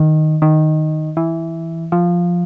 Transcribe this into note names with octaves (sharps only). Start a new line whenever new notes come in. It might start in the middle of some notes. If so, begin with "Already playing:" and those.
Already playing: D#3
D#3
E3
F3